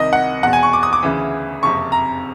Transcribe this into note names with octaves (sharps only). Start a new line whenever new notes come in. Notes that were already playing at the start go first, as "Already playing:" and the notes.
Already playing: C2 C3 D#3 D#5
F#5
E2 B2 F#5
G#5
C#6
D6
D#6
D6
D2 C#3 E3
F#1 F2 C3 C#6
A#5